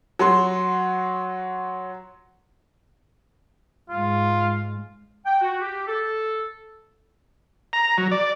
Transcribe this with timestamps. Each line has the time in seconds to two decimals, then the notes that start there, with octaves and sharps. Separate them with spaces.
0.19 F#3 F#4 C6
3.90 G#2 G#3 F4
5.26 G5
5.41 F#4
5.61 G4
5.87 A4
7.73 A#5
7.98 F#3
8.11 D5